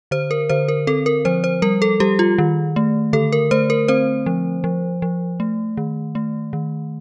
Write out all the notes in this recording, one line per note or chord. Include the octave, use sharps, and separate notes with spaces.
D3 C5
A#4
D3 C5
A#4
C4 A4
A#4
F3 C5
C5
G3 A#4
A4
G3 G4
F4
D#3
A3
D3 A4
A#4
A3 C5
A#4
C4 C5
F3
F3
F3
A3
D#3
A3
D#3